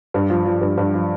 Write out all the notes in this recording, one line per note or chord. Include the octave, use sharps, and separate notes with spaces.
G2
F3
F3
G2
G2
F3